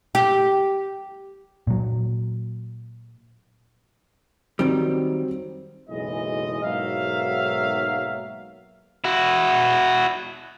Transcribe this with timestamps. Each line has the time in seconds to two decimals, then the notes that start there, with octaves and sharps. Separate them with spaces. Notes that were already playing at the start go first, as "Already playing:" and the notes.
0.15 G4
1.67 A#2 F#3
4.59 D#3 F#3 G3 C4 D7
5.89 F#1 B1 E3 G#3 D#5
6.64 B1 G#2 F#3 A#3 E5 F5
9.04 E4 F#4